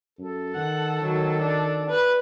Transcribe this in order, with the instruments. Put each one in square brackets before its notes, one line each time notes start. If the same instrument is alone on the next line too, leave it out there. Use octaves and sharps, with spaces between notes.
[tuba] F#2 [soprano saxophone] A4
[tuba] D#3 [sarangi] F#5
[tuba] D#3 [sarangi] F#3
[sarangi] D4
B4